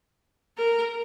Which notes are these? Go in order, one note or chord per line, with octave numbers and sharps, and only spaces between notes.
A#4